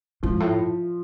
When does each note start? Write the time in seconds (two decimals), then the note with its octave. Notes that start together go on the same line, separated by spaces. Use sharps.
0.23 G#2 F3
0.40 A2